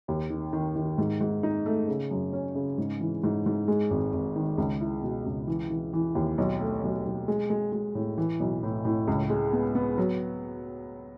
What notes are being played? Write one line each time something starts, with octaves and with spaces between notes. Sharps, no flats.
D#2
D#3
D#3
D#3
G#2
G#2
D#4
A3
C#3
F#2
C#4
C#3
G#2
E3
G#2
G#2
G#3
G#1
G#1
D#3
C#2
E4
B2
C#2
E3
E3
E3
D#2
B1
A3
B1
B1
G#3
G#3
G#3
A2
E3
B1
A2
A2
C#2
G#3
B3
B3
F#3